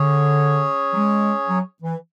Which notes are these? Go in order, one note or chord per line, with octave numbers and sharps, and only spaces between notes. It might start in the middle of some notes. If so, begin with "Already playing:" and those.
Already playing: D3 C#4 G#4 C#5
F#3
G#3
F#3
E3